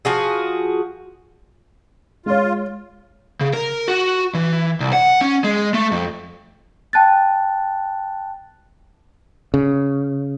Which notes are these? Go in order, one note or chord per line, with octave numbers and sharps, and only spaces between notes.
F3 F#4 G#4
G#3 F4 C#5
C#3
A#4
F#4
E3
C2
F#5
C#4
G#3
A3
F2
G5 A5 F#6 A6
C#3